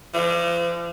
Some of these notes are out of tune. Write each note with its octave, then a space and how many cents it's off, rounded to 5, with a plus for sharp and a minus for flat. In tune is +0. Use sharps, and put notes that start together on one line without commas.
F3 -40